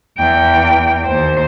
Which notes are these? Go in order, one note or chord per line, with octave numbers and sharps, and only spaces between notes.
E2 G5
D#2 C5